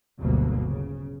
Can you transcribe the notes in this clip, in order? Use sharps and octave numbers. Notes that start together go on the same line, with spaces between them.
G1 D2 B2 D3 F#3 A#3
C#3